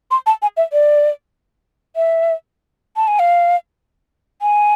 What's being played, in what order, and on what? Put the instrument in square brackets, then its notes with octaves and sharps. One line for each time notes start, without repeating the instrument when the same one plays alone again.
[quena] C6
A5
G#5
E5
D5
E5
A5
G#5
F5
G#5